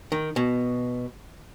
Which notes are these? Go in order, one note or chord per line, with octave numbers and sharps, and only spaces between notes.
D#3
B2